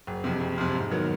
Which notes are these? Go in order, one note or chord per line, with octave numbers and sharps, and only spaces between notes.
F#1
F2 C3
F#1
F2 C3
G#2
D#3 F#3 B3